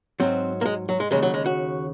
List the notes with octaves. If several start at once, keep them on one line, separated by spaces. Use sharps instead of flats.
G#2 F#3 C4
A#3
G#3
F#3
G#3
D#2 C#3 F#3 G#3
F#3
G#3
F#4